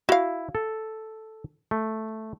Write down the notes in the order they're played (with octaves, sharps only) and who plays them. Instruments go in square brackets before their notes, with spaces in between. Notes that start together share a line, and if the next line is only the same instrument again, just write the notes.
[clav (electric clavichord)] E4 [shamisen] F#4 F5
[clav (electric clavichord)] A4
A3